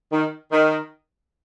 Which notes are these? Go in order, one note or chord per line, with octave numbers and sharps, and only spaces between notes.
D#3
D#3